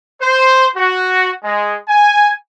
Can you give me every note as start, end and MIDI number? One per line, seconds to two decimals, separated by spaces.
0.22 0.68 72
0.76 1.31 66
1.44 1.76 56
1.89 2.31 80